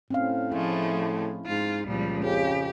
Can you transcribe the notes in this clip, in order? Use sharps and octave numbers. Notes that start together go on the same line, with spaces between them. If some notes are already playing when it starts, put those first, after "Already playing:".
A2 C4 C#4 F5
F3 G#3 A3 E4
G#2 F4
C#2 A#2 F3 G3
F2 C#3 G4